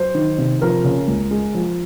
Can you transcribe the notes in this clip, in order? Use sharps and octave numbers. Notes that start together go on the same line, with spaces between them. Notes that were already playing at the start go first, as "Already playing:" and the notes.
Already playing: F#3 C5
D#3
C3
F3 A#4
C#3
C#2
G#3
F3